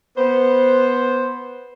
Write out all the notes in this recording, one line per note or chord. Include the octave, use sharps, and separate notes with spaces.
B3 C5